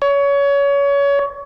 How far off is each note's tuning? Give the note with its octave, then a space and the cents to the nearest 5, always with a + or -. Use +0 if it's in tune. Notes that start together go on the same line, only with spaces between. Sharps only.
C#5 +25